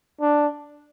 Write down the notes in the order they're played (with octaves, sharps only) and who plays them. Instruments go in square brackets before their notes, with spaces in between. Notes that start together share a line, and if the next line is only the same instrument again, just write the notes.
[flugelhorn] D4